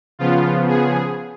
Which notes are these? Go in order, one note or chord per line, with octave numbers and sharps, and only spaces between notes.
C#3 F3 B3 F4
G#4